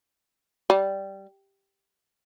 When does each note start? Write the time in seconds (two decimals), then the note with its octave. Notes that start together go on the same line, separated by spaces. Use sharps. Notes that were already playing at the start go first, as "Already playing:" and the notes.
0.70 G3